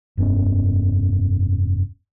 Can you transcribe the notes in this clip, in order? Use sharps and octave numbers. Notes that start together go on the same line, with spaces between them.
F1 G2 B3 C#4